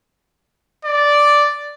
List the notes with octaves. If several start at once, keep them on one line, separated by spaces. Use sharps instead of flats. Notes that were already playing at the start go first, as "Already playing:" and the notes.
D5